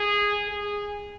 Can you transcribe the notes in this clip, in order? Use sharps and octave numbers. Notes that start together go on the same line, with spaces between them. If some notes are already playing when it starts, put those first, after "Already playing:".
Already playing: G#4
G#4